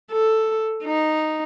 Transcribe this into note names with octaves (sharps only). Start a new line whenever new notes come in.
A4
D#4